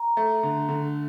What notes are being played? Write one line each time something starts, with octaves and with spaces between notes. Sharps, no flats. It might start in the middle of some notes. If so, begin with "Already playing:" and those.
Already playing: A#5
A3
D3
D3